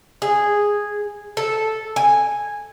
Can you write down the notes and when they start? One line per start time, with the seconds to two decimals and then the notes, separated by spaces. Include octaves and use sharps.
0.22 G#4
1.37 A4
1.96 G#5